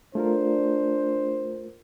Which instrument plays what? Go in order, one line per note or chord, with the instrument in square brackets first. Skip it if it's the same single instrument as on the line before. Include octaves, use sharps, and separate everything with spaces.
[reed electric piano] A3 F4 A#4 [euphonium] D4 [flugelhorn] C5